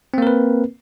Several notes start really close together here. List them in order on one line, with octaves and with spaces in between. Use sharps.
C4 A#3 A#4 B4